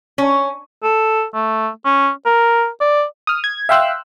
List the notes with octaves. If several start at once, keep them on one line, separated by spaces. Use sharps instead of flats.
C#4
A4
A3
C#4
A#4
D5
D#6 F6
G#6
E5 F5 G5 C6 E6 F#6